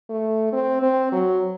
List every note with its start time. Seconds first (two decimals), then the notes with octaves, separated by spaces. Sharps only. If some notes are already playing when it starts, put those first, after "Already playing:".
0.10 A3
0.53 C4
0.82 C4
1.12 F#3